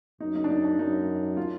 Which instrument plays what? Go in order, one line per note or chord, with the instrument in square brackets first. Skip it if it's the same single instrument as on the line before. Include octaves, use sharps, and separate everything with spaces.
[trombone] F#2 [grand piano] D#4
[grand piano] D#4
D4
D#4
D4
[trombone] F#2 [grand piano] D#4
[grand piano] F4